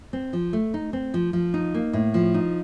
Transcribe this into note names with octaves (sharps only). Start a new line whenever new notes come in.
C4
F3
A3
D#4
C4
F3
F3
D#4
A#3
A2
F3
D#4